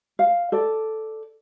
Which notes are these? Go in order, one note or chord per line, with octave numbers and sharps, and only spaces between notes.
F5
A4 D5